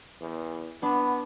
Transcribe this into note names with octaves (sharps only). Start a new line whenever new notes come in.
E2
B3 D4 F#5 B5